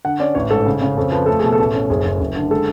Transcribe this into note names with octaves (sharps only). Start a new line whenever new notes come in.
D3 F#5
C#4 D5
A1 C#5
G#2 A4
C#3
C#3
F2 A4
F3 B4
A3 A4
B2 G#4
A4
A1
C#4
F#1 G#4
F#1
F#1
D3
G#3 A4